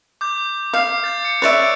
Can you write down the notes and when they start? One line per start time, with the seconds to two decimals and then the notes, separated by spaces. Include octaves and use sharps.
0.21 D6 G6
0.73 F5 D6 G6 C7
1.04 G6 A6
1.25 C#7
1.42 C#5 D5 E5 F#6 D7